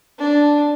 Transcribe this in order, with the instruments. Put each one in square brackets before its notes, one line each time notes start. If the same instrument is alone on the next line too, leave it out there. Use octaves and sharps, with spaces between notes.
[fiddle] D4